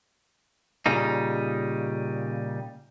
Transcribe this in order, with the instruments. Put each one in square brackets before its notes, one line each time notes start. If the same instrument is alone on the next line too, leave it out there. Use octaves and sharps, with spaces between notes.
[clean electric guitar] A#2 C#3 G3 D#4